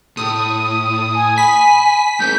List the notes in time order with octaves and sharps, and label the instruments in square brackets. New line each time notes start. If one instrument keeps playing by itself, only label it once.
[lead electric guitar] A2 [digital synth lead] D#6
[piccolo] G#5
[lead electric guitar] G#5 [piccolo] B5 [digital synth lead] B6
[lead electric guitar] G#3 C4 [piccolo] G6